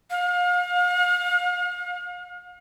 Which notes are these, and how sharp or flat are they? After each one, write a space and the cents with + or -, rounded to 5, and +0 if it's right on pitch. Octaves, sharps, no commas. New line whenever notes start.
F5 +40